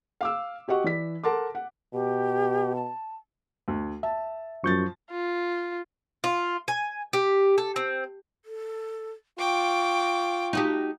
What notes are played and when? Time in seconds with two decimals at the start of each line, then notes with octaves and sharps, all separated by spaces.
0.21 F5 D6 E6
0.68 F#4 G4 D#5 F#5 C#6
0.84 E3 D5 B6
1.24 A4 A#4 F#5 A5 C6 D6
1.55 F#5
1.94 B2 G4
2.76 A5
3.68 D2
4.03 E5 A5
4.64 F#2 F3 C#6 G6 A6
5.11 F4
6.24 F4
6.68 G#5
7.13 G4
7.58 A4
7.76 C4
8.45 A4
9.39 F4 G5 C#6 D6
10.53 D#4 F#4 G4